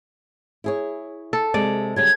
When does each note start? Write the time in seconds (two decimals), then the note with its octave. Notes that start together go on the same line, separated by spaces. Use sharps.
0.64 E4 G#4 C#5
1.33 A4
1.54 C3 G#3 D5
1.96 C#3 F#3 G3 G#6